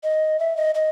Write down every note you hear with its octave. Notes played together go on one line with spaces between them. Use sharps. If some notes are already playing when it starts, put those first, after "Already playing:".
D#5
E5
D#5
D#5